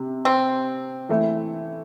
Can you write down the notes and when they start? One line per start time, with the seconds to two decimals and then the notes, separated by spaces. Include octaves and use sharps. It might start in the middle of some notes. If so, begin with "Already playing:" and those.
Already playing: C3
0.25 C4
1.09 E3 A3 E4